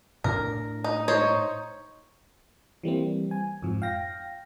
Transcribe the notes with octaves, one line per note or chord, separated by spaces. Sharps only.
A2 D4 A#4
D#4
D#4 C5 C#5
E3 G3 A#3 C4
G#5
F2 G#2 F3
F5 G5 A#6